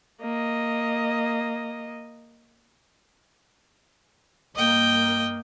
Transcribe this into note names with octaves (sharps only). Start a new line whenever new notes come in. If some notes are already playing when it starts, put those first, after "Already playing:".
A#3 D#5
G2 A#3 D#5 G5